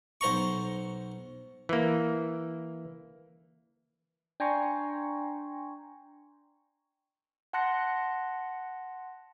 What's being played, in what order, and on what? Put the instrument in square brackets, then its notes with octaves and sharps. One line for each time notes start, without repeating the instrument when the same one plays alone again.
[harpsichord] B1 C5 A#5 C#6
[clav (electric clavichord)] E3 A#3
[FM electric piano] D4 G5 G#5 A#5 C6 C#6
[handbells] F#5 A5 C6 F#6 A#6 C#7